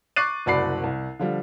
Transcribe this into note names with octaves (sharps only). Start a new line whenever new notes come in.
C#6 D6 F#6 A6 C7 D#7
F#1 C2 F#4 D5 B5 C7
C2
D3 F3 G3